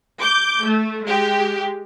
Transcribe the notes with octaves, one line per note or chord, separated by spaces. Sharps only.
D6 G6
A3
G#3 G4